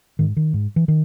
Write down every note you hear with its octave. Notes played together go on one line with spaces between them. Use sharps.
G#2 D#3
D#3
G#2
E3
D#3